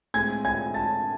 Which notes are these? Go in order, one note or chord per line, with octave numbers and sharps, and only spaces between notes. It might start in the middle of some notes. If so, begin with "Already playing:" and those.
A2 G#3 C4 G#5 G#6
G#5 G#6
A5 A6